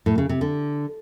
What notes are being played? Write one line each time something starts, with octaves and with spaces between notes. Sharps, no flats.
A2
C#3
C3
D3